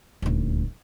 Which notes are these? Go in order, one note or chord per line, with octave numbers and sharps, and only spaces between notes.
D#1 D2